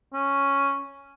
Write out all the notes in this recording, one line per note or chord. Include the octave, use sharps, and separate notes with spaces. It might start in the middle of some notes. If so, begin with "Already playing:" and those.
C#4